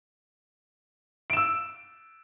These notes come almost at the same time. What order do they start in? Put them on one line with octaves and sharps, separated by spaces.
D7 E7 E6